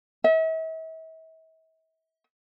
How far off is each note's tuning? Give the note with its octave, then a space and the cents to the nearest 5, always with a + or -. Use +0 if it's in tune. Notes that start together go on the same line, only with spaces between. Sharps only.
E5 -40